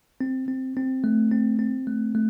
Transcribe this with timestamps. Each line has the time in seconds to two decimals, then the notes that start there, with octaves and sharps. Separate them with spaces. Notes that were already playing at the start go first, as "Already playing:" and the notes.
0.21 C4
0.48 C4
0.77 C4
1.04 A3
1.31 C4
1.59 C4
1.87 A3
2.15 A3